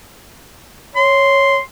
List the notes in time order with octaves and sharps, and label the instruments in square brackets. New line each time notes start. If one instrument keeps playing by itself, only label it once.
[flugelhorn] C#5 [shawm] C6